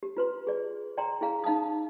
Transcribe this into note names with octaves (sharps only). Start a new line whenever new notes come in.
G4
F4 B4 C6
G#4 D5
D5 G5 A#5 C6
E4 G#4 F5 A#5
D#4 F5 A5 D#6